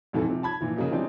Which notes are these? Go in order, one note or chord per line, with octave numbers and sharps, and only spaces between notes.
D#1 F2 E3 F#3 A4
C3 F3
A5 B5 G#6
A#2 E3 F3
C#3 F3 F#3 A#3 D#4
C#3 E3 G3 C4 D4 D#4